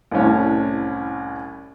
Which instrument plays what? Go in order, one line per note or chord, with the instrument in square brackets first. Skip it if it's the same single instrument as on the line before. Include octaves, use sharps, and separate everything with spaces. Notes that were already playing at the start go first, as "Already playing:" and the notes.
[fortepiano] C2 A2 C#4